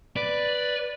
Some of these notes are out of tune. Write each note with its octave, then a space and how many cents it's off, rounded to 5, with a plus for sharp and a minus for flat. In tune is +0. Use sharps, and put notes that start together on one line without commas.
B4 +0 D5 +0